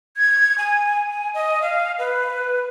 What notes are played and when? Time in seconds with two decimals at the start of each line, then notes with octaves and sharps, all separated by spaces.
0.17 G#6
0.58 G#5
1.11 G#5
1.34 D#5
1.62 F5
1.98 B4